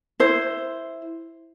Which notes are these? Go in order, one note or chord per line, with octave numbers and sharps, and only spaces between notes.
E4 C5